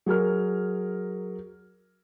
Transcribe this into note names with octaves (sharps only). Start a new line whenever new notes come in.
F#3 G#4 A#4 F6